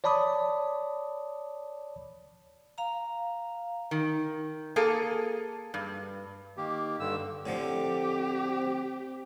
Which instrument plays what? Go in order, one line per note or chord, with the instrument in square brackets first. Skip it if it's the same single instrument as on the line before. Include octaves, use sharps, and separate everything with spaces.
[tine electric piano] C#5 D5 A5 B5 D6 D#6
[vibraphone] F5 A#5
[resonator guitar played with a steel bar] D#3
A#3 G#4 A4
G2
[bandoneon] D#3 A#3 G4
G2 D3 E6
[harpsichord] A2 D3 F3 [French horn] C4 [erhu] G4